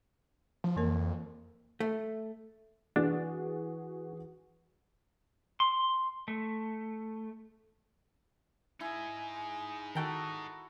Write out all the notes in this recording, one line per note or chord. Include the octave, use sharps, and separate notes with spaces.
F3
F2 E3 A#3 A#4
A3
E3 D4 F#4 G#4
C6
A3
D#4 E4 G#4 G#5
D#3 F#4 A4 G5 A#5